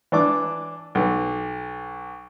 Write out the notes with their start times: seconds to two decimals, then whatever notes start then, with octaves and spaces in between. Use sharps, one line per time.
0.12 E3 D4 D6
0.95 B1